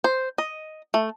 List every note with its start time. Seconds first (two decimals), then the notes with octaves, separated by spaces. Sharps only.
0.04 C5
0.38 D#5
0.94 A3